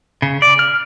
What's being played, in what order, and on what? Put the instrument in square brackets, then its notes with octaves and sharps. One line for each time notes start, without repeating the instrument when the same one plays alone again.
[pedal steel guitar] C#3
D5
F6